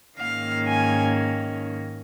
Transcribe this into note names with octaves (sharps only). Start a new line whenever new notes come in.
G#2 D#3 A#3 C#4 F5
G#5